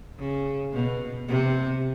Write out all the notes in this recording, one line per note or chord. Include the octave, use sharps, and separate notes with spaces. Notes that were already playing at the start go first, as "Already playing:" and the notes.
C#3
B2
C3